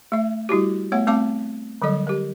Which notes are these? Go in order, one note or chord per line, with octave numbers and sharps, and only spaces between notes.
A3 E5
G3 E4 F#4 G4
A3 B3 C#5 F#5
A3 C4 F5 A5 D6
D3 F#3 G3 A4 D#5
G4 A#4